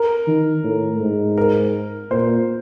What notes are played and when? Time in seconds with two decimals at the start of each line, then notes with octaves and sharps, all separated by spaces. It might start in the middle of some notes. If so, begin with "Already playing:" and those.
Already playing: A#4
0.27 D#3
0.64 A2
1.00 G#2
1.38 A#4
2.10 A#2 C5